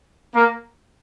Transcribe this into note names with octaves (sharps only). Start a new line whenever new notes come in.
A#3